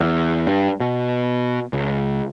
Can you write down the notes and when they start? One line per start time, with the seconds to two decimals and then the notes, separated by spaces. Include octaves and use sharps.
0.01 E2
0.47 G2
0.80 B2
1.73 C#2